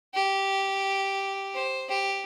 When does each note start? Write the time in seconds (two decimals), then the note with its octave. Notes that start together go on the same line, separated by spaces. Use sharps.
0.14 G4
1.54 C5
1.88 G4